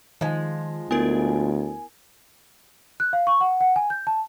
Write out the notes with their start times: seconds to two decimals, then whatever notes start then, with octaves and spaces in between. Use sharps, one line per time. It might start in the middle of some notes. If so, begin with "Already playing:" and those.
0.21 D#3 F3 G#3
0.91 D2 B3 E4 A#4 G#5
3.00 F#6
3.13 F5
3.27 C#6
3.41 F#5
3.61 F#5
3.76 G#5
3.90 G6
4.07 A5